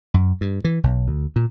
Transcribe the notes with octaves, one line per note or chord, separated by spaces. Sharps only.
F#2
G2
E3
B1
D2
A#2